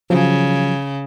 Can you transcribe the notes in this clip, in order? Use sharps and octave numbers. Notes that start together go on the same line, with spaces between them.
C#3 F3 F#3